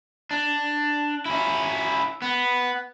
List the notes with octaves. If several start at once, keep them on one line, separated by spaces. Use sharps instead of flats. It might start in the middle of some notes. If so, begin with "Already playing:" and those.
D4
C#4 E4
B3